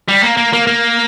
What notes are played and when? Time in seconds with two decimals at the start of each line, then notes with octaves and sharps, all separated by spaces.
0.08 G3
0.23 A#3
0.37 A#3
0.53 A#3
0.67 A#3